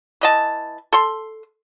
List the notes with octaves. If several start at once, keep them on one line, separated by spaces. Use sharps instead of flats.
E3 D#5 A5
A4 C6